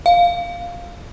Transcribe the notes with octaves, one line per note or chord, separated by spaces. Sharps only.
F5